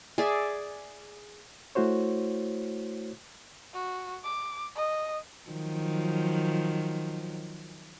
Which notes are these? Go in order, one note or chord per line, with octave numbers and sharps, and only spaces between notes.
G#4 D5 E5
A3 E4 F#4 C5 C#5
F#4
D6
D#5
D#3 F3 F#3